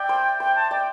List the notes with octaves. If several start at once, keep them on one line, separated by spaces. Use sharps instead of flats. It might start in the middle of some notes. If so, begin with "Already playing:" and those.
Already playing: D5 E5 G5
C5
C5 G5
A5
D5 G5